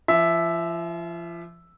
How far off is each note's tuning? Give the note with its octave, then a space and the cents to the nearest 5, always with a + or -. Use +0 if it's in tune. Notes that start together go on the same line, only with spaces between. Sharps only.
F3 -35 E5 +0